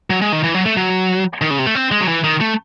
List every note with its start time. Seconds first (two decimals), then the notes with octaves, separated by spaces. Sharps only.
0.10 F#3
0.21 G#3
0.32 D#3
0.44 E3
0.54 F#3
0.66 A3
0.77 F#3
1.41 D#3
1.50 C#3
1.59 C3
1.67 A3
1.75 C4
1.92 G#3
2.01 F#3
2.08 E3
2.24 D#3
2.41 A3